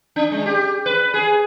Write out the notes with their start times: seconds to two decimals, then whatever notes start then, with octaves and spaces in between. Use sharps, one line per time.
0.16 D4
0.32 G#3
0.46 G4
0.86 B4
1.14 G#4